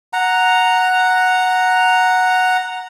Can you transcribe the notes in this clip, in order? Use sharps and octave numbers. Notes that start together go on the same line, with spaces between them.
F#5 A#5